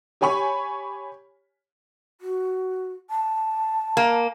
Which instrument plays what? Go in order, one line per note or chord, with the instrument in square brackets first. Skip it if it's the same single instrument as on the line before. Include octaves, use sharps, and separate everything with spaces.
[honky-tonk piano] G4 C#5 G#5 B5 C#6
[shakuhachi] F#4
A5
[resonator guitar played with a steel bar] A#3